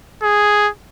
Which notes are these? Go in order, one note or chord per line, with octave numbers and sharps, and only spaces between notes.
G#4